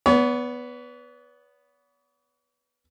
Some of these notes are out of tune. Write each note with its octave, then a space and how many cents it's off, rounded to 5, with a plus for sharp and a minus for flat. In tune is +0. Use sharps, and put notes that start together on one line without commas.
B3 +0 C#5 +45